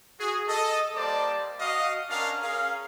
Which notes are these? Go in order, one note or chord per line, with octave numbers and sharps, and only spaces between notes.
F#4 G#4
A4 D#5
G3 A#3 C5 D5 A5 D6
F#4 D#5 F5
C#4 D4 A#4 F5
C#4 G#4 A#4 F5